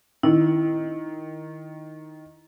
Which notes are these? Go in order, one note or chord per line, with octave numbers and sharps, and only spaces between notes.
D#3 E4